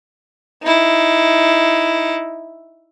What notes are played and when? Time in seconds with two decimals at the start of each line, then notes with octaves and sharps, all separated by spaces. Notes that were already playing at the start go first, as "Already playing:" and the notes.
0.63 D#4 E4